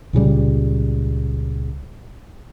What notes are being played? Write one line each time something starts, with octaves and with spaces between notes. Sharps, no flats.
C#2 A#2 C#3 G3